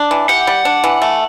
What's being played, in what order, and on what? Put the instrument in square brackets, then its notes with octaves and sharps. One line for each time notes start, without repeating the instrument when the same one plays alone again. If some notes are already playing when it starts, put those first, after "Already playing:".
Already playing: [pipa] D4
E3
[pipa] G4 [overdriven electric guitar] F#5
[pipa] G3
D4
E3
A3